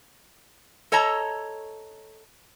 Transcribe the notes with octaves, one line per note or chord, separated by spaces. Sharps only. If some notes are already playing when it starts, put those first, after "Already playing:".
A4 C#5 D#5 A5 A#5